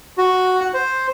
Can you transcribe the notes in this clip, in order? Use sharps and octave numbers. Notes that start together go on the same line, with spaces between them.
F#4
F#5
C5